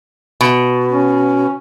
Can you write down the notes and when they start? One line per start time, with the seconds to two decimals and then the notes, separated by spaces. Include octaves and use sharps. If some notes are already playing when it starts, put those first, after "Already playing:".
0.41 B2
0.91 C#4